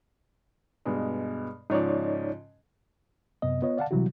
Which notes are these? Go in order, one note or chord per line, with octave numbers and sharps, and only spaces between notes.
G2 B2 G#3
G#2 C#3 F3 D#4 C#5 D5
F#2 C3 B3 D#5
B3 F4 C#5 D#5
D5 F5 F#5 A5
C3 E3 F#3 G3 E4 F#4